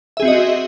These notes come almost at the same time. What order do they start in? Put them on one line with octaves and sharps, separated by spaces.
E5 G#4 C4 F#4 D#5